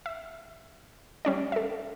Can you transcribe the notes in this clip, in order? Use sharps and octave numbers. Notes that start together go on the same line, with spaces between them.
E5
G3 C#4 D5
A4 E5